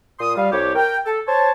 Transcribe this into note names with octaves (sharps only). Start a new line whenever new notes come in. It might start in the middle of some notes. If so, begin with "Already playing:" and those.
A#2 C6 D#6
G3 F5
C2 G4 C#5
A#4 G5
A4
C5 C#5 A5